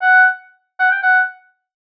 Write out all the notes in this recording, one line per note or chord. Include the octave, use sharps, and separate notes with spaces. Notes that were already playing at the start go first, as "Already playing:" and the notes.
F#5
F#5
G5
F#5